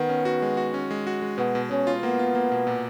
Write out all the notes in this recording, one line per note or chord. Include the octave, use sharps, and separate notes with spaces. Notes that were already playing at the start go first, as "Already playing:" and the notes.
Already playing: D#3 B3
C#4
F#4
G#3
F#4
C#4
G#3
F#4
G#3
B2 B3
B2
B2 C#4
F4
A#3 B3
F4
A#3
B2
A#2